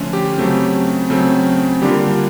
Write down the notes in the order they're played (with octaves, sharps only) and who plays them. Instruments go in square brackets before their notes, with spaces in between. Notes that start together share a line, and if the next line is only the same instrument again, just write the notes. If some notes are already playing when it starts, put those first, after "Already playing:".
Already playing: [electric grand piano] D3 F3 A3 C#4 F4
G4
C#3 F#3 A3 C4
C#3 F#3 A3 C4
D3 G3 A#3 D4 F4 G4